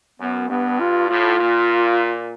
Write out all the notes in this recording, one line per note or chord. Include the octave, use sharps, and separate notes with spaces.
F#2 B3
G2 B3
F4
A2 F4
A#2